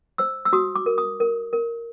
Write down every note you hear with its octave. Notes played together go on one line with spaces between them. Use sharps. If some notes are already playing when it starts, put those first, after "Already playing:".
C5 E6
E6
F#4 D#6
D6
A#4
D#6
A#4
A#4